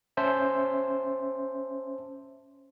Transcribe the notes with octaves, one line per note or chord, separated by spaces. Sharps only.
C#4 C5 E5 A5